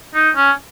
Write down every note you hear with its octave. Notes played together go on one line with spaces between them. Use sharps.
D#4
C#4